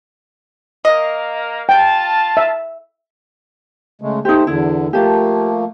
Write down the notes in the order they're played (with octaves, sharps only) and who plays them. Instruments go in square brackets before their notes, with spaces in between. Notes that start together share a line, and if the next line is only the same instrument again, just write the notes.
[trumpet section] A#3 A#4 F5 [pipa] D#5
[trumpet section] F4 A5 [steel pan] G5
[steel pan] E5
[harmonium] C#3 G#3 A3
[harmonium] A3 C5 [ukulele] D#4 G4
[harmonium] E2 D3 [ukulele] E4
[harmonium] F3 A3 A#3 [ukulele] G4 A5